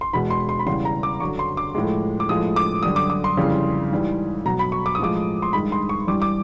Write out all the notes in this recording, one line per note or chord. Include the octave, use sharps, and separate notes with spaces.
C6
E2 B2 G#3 B5
C6
C6
B5
E2 C#3 E3 G3 C6
A#5
D6
F#2 D3 F#3 C#6
C6
D6
A2 F3 G#3
D6
A2 F3 G#3 D#6
D6
F#2 D3 G3 D#6
D6
D6
C6
F2 C#3 E3 G3
G#2 E3 G3
B2 F#3 A#5
B5
C#6
D6
D#6
A2 F3 G#3 D6
C6
G2 D#3 G#3 B5
C6
C#6
G2 E3 G3 D6
D6